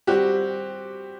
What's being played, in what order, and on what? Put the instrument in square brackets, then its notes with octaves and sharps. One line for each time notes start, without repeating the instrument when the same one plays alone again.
[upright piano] G3 C4 F#4 [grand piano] G4